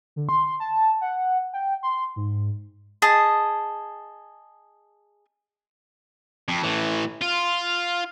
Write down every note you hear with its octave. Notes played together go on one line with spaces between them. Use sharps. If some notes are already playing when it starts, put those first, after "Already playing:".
D3
C6
A5
F#5
G5
C6
G#2
G#4 D#5 A5
F2
A2 E3
F4